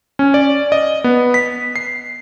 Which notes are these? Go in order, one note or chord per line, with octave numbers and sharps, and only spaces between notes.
C#4
D5
D#5
B3
B6
C7